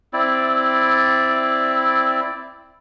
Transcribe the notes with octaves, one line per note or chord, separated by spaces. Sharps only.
C4 E4 D5